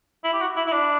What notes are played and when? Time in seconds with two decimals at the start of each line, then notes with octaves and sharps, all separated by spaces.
0.24 E4
0.34 G4
0.41 F#4
0.56 E4
0.67 E4
0.72 D4